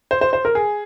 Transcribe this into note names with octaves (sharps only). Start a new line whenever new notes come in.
C5
C5
C5
A#4
G#4